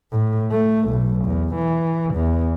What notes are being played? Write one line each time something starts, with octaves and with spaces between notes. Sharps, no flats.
A2
A3
B1
E2
E3
E2